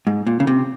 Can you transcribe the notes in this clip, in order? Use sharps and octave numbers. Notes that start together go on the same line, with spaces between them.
G#2
A#2
C#3
C3